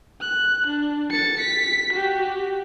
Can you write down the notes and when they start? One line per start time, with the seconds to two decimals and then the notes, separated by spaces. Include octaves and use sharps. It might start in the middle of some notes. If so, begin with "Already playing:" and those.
0.21 F#6
0.67 D4
1.11 A6 C#7
1.40 B6
1.93 F#4 G4